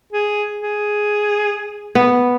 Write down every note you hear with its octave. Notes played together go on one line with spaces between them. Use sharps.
G#4
G#4
B3